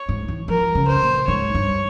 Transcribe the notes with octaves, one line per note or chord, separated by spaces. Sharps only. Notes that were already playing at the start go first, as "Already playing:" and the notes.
Already playing: C#5
G#2
E3
F3 A#4
C#3
C5
A#2
G#2 C#5
G2